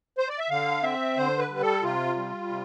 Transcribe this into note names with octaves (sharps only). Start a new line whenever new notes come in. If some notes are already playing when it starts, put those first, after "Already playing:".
C5
D5
E5
D3 F5
C4 E5
D3 C5
B4
G3
A4
C3 F4
G3
C3